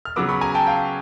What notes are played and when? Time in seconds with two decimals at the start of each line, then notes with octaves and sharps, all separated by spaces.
0.05 F6
0.16 C#3 F#3 B3 D6 E6
0.29 B5 C#6
0.41 G#5 A#5
0.54 G5 A5
0.67 F5 G5